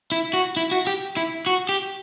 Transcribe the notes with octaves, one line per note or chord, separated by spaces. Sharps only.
E4
F#4
E4
F#4
G4
E4
F#4
G4